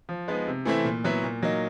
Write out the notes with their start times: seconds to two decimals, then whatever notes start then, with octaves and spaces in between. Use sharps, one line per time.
0.09 F3
0.28 G#3 B3 D#4
0.47 C3
0.65 E3 A3 C4 E4
0.84 A#2
1.04 F#3 B3 E4
1.23 A#2
1.42 F#3 A#3 D#4